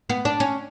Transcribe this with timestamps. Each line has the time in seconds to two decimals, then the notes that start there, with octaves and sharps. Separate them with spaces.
0.10 B3
0.25 D4
0.40 C#4